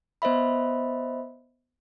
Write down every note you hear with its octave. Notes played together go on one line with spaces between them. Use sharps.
B3 C5 D#5 E5 B5